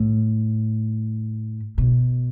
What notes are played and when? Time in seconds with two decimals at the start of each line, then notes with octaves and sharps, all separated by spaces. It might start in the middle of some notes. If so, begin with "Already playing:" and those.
Already playing: A2
1.78 B2